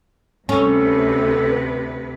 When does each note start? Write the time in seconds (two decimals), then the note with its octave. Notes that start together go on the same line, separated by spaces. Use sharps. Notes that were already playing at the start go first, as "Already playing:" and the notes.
0.49 D2 C3 C#4 A4 B4